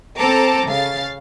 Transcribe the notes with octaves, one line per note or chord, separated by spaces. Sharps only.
C4 A4 A5 A#5 D6
C#3 F5 A6